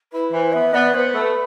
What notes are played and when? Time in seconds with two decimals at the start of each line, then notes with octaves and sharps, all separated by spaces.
0.12 E4 B4
0.32 E3 C5
0.52 B3 E5
0.73 B3 D5
0.94 B3 C5
1.14 A3 B4